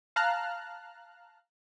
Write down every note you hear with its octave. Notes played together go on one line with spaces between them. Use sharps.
F5 A5 A#5 F6 F#6